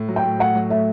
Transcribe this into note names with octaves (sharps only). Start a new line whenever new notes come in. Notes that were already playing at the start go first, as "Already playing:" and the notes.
Already playing: A2
F#3
G5
A2
A2 F#5
F#3
A3 E5